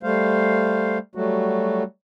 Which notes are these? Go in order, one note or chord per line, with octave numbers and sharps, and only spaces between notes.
G3 A3 C5 F5
F#3 G3 A3 F#4